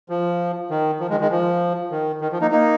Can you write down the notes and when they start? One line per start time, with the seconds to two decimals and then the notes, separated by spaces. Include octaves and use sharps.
0.09 F3
0.70 D#3
1.00 F3
1.10 D#3 G#3
1.20 D#3 G#3
1.31 F3
1.91 D#3
2.21 D#3
2.31 F3
2.41 A#3 D#4
2.51 A#3 D#4